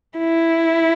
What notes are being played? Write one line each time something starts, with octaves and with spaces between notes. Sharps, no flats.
E4